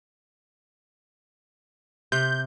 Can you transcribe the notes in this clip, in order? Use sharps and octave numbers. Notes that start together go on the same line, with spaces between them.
C3 G6